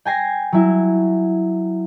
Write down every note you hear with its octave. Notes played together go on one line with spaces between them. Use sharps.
G5 G#5 A#6 C7
F#3 E4